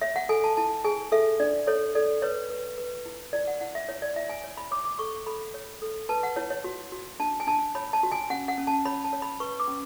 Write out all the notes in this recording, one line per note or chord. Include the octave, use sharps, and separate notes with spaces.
C#5 E5
F#5
A4 G#5
A5
E4 A5
G#4 G#5
A4 E5
D4 D5
A4 C#5
A4 D5
B4 C#5
B4
B4
E4
E4 D5
F#5
E4 F#5
E5
E4 C#5
D5
E4 E5
G#5
C#5
B5
C#5 D6
D6
A4 C#6
A4 B5
C#5
A4
B4 A5
F#5
E4 C#5
C#5
F#4
F#4
D4 A5
G#5
D4 A5
C#5 B5
A5
F#4
G#5
C#4 F#5
F#5
C#4
A5
C#5 B5
A5
C#5
B5
B4 C#6
D6
C#4